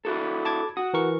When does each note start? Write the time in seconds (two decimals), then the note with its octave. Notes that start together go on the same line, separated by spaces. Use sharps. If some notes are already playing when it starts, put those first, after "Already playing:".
0.05 E4 F#4 A4
0.45 A5 D6 G#6
0.77 F#4 D#6
0.94 E3 A#4 C#6